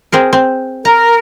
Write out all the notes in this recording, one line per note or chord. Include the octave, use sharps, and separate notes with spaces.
C4 G#4 A#4
C4
A#4 A#5